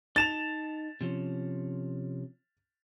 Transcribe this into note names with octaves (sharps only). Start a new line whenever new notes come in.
D#4 A5 A6 E7 F7
C3 F3 C#4